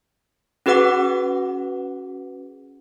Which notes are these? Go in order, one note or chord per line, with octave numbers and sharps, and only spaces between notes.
C#4 F#4 G#4 B4 F#5 D6